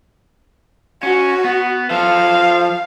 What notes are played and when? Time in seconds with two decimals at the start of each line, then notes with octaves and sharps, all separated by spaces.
1.03 C#4 F#4
1.44 B3
1.91 F3 A4 F5